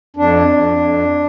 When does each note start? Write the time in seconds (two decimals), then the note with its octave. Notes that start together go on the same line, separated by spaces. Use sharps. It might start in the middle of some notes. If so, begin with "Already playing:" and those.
0.16 F2 D4
0.47 F2
0.78 F2